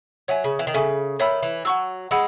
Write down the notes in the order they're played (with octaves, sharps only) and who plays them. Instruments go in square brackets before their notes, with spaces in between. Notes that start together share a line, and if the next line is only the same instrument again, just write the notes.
[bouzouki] F#3 [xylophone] C#5 E5 G#5
[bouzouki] C#3
E3
D#3
[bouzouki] C#3 [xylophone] A4 E5 G#5
[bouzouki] D#3 [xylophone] C#5 E5 B5 E6
[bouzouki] E3
[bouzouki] F#3 [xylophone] F#5 C#6 E6
[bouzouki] G#3 [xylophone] F#5 B5 E6